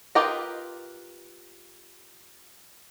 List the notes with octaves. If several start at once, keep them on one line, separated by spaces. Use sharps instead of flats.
F4 G4 A#4 B4 D#5